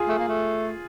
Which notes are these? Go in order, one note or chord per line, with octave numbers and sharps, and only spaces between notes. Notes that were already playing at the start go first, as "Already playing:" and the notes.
Already playing: F4 G#4
A3
A#3
A3